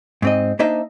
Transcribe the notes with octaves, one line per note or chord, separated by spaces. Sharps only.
G#2 C4 D#5
A#3 D4 D#4 C5 D#5 E5